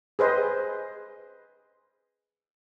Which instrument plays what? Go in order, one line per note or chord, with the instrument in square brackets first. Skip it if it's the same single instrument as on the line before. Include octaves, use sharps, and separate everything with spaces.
[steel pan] G#4 B4 C5 D#5